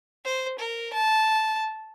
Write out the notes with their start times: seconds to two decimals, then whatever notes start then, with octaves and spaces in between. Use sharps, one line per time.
0.25 C5
0.59 A#4
0.93 A5